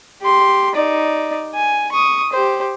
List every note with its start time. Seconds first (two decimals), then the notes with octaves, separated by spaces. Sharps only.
0.21 G4 C6
0.75 D#4 D5
1.54 G#5
1.92 C#6 D#6
2.33 G4 C5